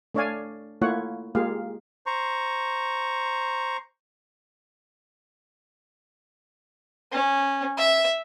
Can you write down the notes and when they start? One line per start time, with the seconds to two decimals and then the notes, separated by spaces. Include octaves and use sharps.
0.14 A3 D4 C#5 D5 F5 G#5
0.82 A3 A#3 E4 F4 C#5 F#5
1.35 G#3 A#3 F4 G4 G#4 F5
2.06 C5 A#5 C#6
7.12 C#4
7.78 E5